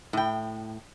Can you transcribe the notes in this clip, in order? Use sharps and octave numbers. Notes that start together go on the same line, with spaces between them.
A2 G5